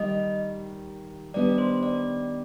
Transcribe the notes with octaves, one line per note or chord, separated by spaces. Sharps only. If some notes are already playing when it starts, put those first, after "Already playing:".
Already playing: D#2 D#3 G3 D#5
D#3 G3 B3 D4 G4 D5
C5
D5